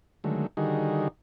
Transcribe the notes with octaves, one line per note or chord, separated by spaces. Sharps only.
D3 D#3 F#3 G#3 A3
D3 D#3 G3 D#4 F#4 G#4